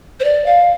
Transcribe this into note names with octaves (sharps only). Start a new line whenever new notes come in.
C5
D5
F5